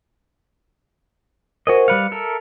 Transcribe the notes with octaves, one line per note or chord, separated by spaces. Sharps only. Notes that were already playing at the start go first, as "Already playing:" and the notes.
F#4 G#4 A#4 C5 D#5
G3 B4 F5 C#7
A4 A#4 E5